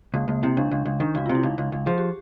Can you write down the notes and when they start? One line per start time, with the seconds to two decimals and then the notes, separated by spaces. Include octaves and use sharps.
0.14 C#2 A#3
0.28 C#2 A#3
0.43 C3 E4
0.57 C#2 D4
0.71 C#2
0.86 C#2
1.00 D#3 D4
1.15 C#2 F#4
1.26 C3 F4
1.35 E4
1.43 C#2 D#4
1.58 C#2
1.72 C#2
1.86 F3 G#4
1.98 G4